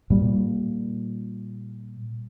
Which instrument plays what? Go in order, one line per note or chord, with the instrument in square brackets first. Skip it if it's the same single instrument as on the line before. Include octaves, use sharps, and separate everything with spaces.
[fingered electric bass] A#2 G3 A#3